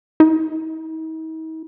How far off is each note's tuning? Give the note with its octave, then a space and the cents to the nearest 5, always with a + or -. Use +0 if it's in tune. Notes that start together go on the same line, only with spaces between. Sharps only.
D#4 +45